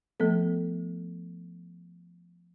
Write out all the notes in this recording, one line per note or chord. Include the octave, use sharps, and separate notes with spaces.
F3 A3 B3 A4